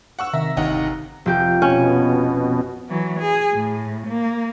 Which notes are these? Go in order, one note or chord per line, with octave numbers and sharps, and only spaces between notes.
F#5 C#6 E6
C3 D#3 E5 A#5
G1 D#2 D#4 F#5
F1 G4 G6
B2 C#4
E3 F#3
G#4
A2
A#3